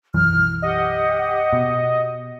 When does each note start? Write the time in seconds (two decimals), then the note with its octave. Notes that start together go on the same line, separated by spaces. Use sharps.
0.14 B1 F#2 E3 F6
0.62 G4 D#5 F#5
1.53 B2